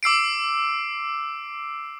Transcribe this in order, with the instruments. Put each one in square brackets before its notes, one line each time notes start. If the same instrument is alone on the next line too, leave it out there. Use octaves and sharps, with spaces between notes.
[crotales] D6 E6 C7 D7